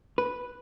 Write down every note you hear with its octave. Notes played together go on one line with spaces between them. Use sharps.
B4